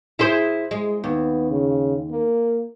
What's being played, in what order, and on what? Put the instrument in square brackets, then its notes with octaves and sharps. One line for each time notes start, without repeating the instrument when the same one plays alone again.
[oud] E4 G#4 C5
G#3
[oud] D#2 [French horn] B3
[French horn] C#3
A#3